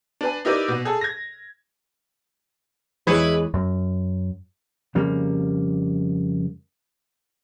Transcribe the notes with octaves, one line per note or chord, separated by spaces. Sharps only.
D4 B4 G#5
D#4 E4 G4 A#4 B4 D5
B2 B3
G#4 A4
G#6 A#6
E2 E3 G#3 E4 G#4 B4 C#5
F#2
F2 C#3 G3 A#3